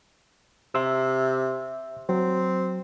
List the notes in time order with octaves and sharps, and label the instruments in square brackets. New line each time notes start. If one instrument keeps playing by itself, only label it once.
[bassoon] C3 [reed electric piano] E5 C6 E6
[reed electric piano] F#3 [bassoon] C4